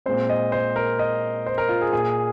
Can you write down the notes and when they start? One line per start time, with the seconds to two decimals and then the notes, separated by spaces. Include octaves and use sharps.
0.06 A#2 G#3 C4 C5
0.29 D#5
0.52 C5
0.76 A#4
0.99 D#5
1.46 C5
1.58 A#4
1.69 F4
1.81 G#4
1.93 A#2 A#3 G#4